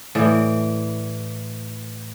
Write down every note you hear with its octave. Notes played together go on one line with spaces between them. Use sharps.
A2 E3 D5